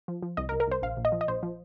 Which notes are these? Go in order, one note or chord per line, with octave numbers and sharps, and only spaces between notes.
F3
F3
C2 D#5
A#4
C2
A#4
C2 C5
A#1 F5
A#1
D#5
F3
D#5
A#1 C5
F3